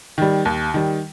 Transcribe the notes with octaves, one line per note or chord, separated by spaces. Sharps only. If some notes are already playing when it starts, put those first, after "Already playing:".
D#3 G3
D#2
D#3 G3